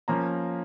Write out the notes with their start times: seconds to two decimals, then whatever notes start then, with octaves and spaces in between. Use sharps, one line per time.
0.08 F3 A#3 C#4 A#5